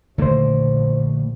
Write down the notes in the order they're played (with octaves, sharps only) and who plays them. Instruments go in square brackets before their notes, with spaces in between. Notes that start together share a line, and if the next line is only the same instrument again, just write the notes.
[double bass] A#1 A2 [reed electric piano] D#2 C5 [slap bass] D3 A3 A#3